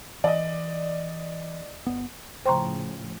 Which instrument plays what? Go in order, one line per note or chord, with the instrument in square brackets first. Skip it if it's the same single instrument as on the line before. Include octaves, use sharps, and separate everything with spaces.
[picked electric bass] E3 [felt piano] D5 D#5
[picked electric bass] G1 B3
[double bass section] A2 C#3 F3 [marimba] C5 A#5 [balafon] G5 C6 C#6